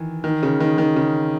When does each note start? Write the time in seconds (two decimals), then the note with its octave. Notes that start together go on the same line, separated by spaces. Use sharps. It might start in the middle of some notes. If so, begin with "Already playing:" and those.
Already playing: D#3 E3
0.24 D#3
0.43 C#3
0.60 D#3
0.78 D#3
0.96 C#3